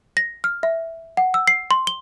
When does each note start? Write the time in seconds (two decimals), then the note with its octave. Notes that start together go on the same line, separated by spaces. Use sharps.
0.17 A#6
0.44 F6
0.63 E5
1.17 F#5
1.34 E6
1.48 C7
1.71 C6
1.87 G7